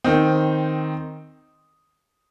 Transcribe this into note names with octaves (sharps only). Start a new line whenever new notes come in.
D#3 C4 D#4